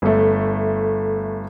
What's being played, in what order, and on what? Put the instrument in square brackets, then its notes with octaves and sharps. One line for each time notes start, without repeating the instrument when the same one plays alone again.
[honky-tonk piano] G1 A3